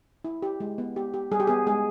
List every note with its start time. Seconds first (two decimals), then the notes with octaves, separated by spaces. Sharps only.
0.24 E4
0.42 G4
0.60 G#3
0.78 B3
0.96 G4
1.14 G4
1.31 G3 G#4
1.40 G4
1.47 B3 G#4
1.67 G#3 G#4